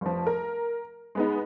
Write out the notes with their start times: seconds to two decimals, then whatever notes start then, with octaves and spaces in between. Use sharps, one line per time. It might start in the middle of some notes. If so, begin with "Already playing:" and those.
0.01 F1 F3
0.26 A#4
1.15 G#3 B3 D#4